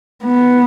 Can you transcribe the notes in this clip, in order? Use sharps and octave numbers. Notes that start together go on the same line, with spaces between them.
B3